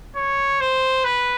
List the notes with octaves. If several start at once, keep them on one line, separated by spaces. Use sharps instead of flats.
C#5
C5
B4